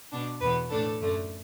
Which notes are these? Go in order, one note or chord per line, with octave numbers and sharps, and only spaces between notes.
B2 B3 D4
E2 B2 B3 B4
A2 A3 D4 A4
F#2 D3 A3